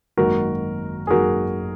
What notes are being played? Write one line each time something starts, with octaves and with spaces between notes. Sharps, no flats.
G#1 F#2 D#3 A#3 F#4 A#4
G#4
G#1 F#2 D#3 A#3 F#4 A#4